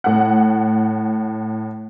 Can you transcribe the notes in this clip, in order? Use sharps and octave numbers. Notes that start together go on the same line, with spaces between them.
A2 F#5